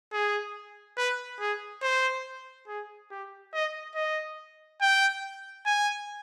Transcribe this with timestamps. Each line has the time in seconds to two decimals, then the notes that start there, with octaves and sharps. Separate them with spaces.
0.12 G#4
0.97 B4
1.40 G#4
1.82 C5
2.67 G#4
3.11 G4
3.53 D#5
3.95 D#5
4.81 G5
5.66 G#5